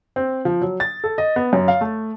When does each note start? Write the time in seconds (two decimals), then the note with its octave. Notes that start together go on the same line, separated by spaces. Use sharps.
0.16 C4
0.45 F3
0.62 F#3
0.80 A6
1.04 A4
1.18 D#5
1.36 B3
1.53 F#2
1.68 F5
1.81 A3